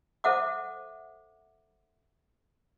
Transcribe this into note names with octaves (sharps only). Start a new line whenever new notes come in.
A4 C5 E5 F#5 D6